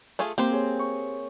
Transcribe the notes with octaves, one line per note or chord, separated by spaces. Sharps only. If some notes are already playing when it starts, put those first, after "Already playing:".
A3 F4 G#4
A#3 C4 G4 C5
G#4 C#5
C#6